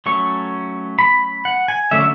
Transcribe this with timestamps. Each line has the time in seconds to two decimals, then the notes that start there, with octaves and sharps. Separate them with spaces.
0.06 F#3 A3 C#4 C#6
0.99 B5
1.45 F#5
1.68 G#5
1.91 D3 F#3 A3 C#4 E5